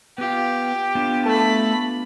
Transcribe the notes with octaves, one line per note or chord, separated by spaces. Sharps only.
B3 F4 G4
B3 D4 F4
A3 A5 B5